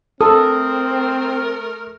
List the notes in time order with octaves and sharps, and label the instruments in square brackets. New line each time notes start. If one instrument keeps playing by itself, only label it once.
[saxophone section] A3 A#4 [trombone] C4 [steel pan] A4 [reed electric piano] D#6